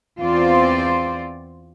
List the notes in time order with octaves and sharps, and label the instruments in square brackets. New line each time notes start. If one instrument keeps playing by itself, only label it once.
[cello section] E2 C4 F4 C5 D5